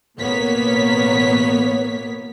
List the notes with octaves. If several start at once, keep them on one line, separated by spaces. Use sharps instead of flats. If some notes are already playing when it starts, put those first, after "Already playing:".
A1 B2 A#3 B3 C#5 B6